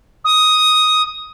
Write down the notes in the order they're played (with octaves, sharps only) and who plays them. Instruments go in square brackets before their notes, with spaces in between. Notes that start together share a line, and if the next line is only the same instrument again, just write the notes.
[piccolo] D#6